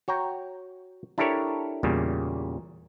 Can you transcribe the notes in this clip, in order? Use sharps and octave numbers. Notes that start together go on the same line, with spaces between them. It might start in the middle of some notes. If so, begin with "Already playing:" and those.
F#4 C#5 G5 A#5
D4 E4 G4 A4 A#4 C#5
E2 A#2 C#3 G3